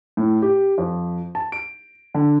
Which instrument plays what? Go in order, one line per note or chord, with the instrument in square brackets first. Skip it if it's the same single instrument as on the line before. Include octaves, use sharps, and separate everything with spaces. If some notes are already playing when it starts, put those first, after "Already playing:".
[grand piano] A2
G4
F2
A5
D7
D3